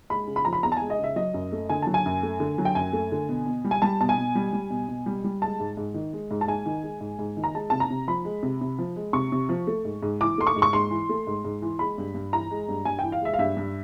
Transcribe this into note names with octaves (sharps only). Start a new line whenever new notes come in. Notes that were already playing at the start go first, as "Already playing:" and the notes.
G#3 B5
C#3
B5
F3 A#5
B5
E2 A#5
A5
G#3 G#5
D#5
C#3 E5
F#3 D#5
F#2
A3
D3 G#5
F#3 A5
G#5
F#2
A3
D3
F#3
G5
F#2 G#5
A3
D3
B2
B2
G3
G#5
G3 A5
B2 A5
G#5
B2
G3
G3
B2
B2
G3
G3
G#3 A5
G#2
G#2
D#3
G#3
G#2
A5
G#2 G#5
D#3
G#3
G#2
G#2
D#3
A#5
G#3 A5
C3 A5
A#5
C3
F3 B5
G#3
C3
C3
F3
G#3
C3 C#6
C3
F3
A3
G#2
G#2
E3 D6
A3 C6
C#6
G#2
C#6
G#2 C6
E3
A3
G#2
G#2
E3
G#3 B5
G2
G2
E3 A#5
G#3
G2
G2 G#5
E3 G5
F5
G#3 E5
F5
G2 E5
G2